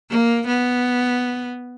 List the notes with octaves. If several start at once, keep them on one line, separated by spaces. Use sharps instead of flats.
A#3
B3